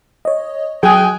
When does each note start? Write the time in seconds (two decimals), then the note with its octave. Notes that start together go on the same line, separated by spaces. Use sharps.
0.25 C#5 D#5
0.83 F#3 G#4 G5 G#5 F#6